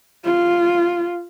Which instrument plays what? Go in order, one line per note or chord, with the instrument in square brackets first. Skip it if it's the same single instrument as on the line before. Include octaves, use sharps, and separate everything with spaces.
[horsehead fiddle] F4